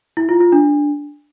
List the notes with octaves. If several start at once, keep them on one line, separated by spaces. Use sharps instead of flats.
E4
F4
F4
D4